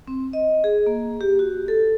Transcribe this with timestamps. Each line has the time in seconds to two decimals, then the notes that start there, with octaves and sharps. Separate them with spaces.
0.08 C4
0.33 D#5
0.64 G#4
0.86 A#3
1.21 G4
1.39 F#4
1.68 A4